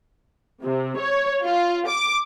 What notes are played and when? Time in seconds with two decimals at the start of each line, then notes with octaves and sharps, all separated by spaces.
0.63 C3
0.97 C#5
1.43 F4
1.87 D6